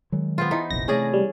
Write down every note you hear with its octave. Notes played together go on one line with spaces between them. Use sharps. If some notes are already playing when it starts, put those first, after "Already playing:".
D#3 F#3 G#3
B3 C4 F4
E3 D#4
F1 A#1 F2 A#6
C3 A3 C#4 G#4 D5
G3